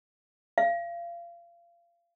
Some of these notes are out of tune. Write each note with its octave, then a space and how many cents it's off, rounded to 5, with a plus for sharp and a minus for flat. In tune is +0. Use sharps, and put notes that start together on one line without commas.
F5 -30